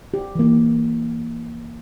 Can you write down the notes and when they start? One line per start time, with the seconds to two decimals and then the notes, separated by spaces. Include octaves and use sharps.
0.14 G4
0.35 E3 A#3